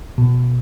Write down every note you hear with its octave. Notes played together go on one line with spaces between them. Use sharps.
B2